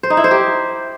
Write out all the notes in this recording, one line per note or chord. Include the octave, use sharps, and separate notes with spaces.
C5
D#4
E4
C5
G4